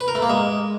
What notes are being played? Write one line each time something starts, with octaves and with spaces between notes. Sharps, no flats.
B4
A#4
A3
A#3
G#3